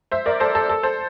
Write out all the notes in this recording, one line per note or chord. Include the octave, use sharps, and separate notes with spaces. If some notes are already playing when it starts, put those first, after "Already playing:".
C5 E5
A#4 D5
A4 C5
A4
A4
A4 C5